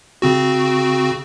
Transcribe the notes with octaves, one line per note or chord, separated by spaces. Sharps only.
C#3 C4 F#4